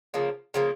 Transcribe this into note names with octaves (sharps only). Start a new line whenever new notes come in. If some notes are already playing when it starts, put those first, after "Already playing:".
C#3 F3 A#3
C#3 F3 A#3